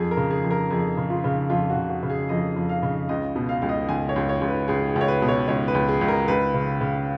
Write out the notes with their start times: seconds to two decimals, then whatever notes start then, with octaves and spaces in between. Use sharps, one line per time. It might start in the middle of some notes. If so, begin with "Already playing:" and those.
Already playing: F2 G#4
0.11 A#4
0.17 C#3
0.30 G#4
0.44 F2
0.50 A#4
0.70 F2 G#4
0.97 C#3
1.10 F4
1.24 C#3
1.50 F2 F4
1.70 F#4
1.76 C#3
1.90 F#4
2.03 C#3
2.10 G#4
2.29 F2 D#5
2.56 F2
2.69 F5
2.83 C#3
3.09 C#2 D#5
3.36 B2
3.49 F5
3.62 C#2 F5
3.69 D#5
3.89 C#2 G#5
4.09 C#5
4.16 C#2
4.29 C#5
4.41 C#2
4.48 B4
4.68 C#2 G#4
4.89 G#4
4.96 C#2
5.01 C#5
5.08 B4
5.22 B2
5.28 C#5
5.48 C#2 C#5
5.68 B4
5.75 C#2
5.88 G#4
6.01 C#2
6.08 A#4
6.28 C#2 B4
6.54 C#3
6.81 C#3